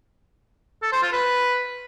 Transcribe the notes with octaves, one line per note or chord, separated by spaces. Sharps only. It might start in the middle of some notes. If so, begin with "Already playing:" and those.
A4
C5
F4
B4